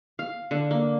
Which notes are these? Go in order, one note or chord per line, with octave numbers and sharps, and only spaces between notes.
F5
D3
A#3